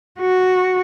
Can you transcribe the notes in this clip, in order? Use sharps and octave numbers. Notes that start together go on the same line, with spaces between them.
F#4